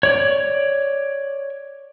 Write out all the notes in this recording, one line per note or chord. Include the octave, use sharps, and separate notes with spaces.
C#5 D5